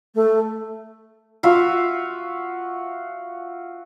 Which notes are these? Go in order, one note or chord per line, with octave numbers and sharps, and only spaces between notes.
A3
F4 F#4 E5 F5